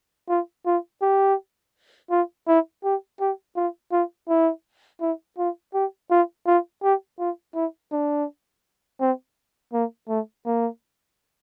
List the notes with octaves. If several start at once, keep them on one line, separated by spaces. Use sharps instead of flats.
F4
F4
G4
F4
E4
G4
G4
F4
F4
E4
E4
F4
G4
F4
F4
G4
F4
E4
D4
C4
A#3
A3
A#3